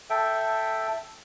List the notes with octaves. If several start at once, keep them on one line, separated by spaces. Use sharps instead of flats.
A4 E5 G5